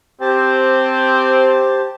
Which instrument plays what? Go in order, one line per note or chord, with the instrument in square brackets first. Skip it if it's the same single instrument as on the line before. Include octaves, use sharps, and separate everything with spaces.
[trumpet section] C4 [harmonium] G4 C5 A5